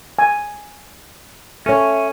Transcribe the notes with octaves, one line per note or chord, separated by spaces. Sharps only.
G#5
C#4 A4 C#5 E5